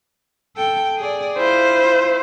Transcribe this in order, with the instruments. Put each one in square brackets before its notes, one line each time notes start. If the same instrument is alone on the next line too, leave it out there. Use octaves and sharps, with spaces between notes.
[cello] A4 G5
G#4 D5
[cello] E4 F4 [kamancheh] C5